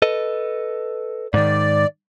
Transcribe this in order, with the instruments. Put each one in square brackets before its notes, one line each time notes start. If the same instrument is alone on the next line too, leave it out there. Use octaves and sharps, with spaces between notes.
[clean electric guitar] A4 B4 D#5
[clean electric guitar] G#2 D#3 [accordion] D5